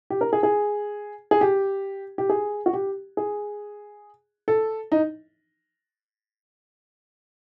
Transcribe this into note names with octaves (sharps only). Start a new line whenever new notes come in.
G4
A#4
G#4
G#4
G#4
G4
G4
G#4
F#4
G4
G#4
A4
D#4